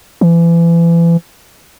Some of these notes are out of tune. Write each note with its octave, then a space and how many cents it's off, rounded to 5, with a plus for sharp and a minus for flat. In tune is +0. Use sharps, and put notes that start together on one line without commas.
E3 +35